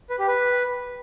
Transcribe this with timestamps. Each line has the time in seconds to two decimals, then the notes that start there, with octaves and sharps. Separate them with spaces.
0.10 B4
0.19 G4
0.28 B4